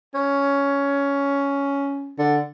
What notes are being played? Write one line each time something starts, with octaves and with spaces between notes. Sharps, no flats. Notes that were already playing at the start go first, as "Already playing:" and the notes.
C#4
D3